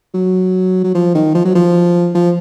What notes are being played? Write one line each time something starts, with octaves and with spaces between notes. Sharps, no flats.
F#3
F#3
F3
D#3
F3
F#3
F3
F3